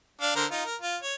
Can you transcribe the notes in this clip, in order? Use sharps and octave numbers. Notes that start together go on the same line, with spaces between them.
D4 F5
D3 A#4 C5
D#4 F4
A#4
F4
C#5